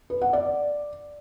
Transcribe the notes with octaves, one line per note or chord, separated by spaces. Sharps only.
B4
F#5
D5